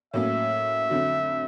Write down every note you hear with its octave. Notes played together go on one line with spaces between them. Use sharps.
A2 F#3 A#3 C#4 E5
F2 D3 F#3